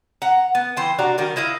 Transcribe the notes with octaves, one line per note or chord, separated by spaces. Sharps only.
F#5 A#5
B3
E3 C5 G5
C3 D4 F#4 A#5
D#3 G3 D#4 A#4
D#4 E4 D#5 F5